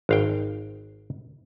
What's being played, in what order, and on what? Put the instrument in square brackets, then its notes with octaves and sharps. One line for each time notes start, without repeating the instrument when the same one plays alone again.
[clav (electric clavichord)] G#1 F5 G5